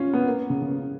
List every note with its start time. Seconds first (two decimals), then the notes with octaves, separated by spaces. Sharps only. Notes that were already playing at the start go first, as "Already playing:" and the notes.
Already playing: C#4 F4
0.13 B3
0.26 A#3
0.50 C#3
0.62 C#3